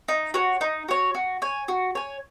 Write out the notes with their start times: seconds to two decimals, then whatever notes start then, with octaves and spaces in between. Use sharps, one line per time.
0.08 D#4
0.34 F#4 C#5
0.61 D#4
0.88 F#4 C#5
1.15 F#4
1.42 C#5 G#5
1.68 F#4
1.95 C#5 G#5